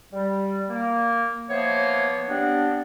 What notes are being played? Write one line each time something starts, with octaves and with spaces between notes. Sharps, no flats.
G3
A#3
E3 F3 A#3 B3 C5 C#5
G3 B3 C4 D4